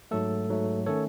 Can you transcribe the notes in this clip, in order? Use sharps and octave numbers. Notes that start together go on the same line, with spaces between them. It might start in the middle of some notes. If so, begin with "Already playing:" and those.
G#2 F#3 A3 A4
G#2 F#3 A3
D#3 A3 C#4 A4 C#5